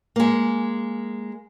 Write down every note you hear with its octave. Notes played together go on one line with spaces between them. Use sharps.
G#3 A#3